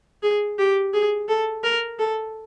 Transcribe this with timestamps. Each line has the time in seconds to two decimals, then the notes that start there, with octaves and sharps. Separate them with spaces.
0.23 G#4
0.58 G4
0.94 G#4
1.29 A4
1.63 A#4
1.99 A4